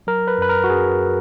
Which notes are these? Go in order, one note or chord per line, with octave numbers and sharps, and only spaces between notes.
F#3 A#4
B4
F#2 B4
A#4
F#4
F#2 G#4